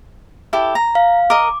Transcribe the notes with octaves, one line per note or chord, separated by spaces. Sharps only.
E4 G4 A4
A#5
F5
A#4 D#5 D6